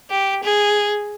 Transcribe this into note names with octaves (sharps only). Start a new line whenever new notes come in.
G4
G#4